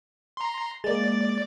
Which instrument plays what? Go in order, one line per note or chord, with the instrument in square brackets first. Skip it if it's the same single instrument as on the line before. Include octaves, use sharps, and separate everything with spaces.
[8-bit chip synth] A#5 C6
[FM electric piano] G#3 A#3 [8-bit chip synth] D5 A6